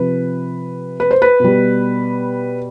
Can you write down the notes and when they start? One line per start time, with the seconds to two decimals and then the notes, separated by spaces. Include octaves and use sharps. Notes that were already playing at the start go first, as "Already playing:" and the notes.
Already playing: C3 F3 B4
1.00 B4
1.11 C5
1.22 B4
1.40 B2 G3